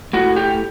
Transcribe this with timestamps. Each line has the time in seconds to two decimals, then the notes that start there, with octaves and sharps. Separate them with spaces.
0.13 A2 F#4
0.36 G4